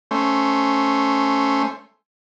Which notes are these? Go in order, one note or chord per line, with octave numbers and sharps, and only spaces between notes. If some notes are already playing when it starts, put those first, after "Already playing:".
A3 C#4 C5